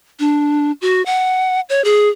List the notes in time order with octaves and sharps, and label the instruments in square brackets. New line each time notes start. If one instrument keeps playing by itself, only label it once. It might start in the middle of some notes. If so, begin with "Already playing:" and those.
[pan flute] D4
F#4
F#5
C#5
G#4